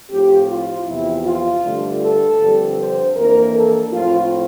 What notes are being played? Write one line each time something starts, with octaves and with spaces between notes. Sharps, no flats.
A2 F3 C4 G4
F4
E2 C3 F3 E4
F4
G2 D3 A3 D4
A4
G2 D3 F3 C4
C5
F2 E3 A#3 D4 A#4
A4
A2 F3 C4 F4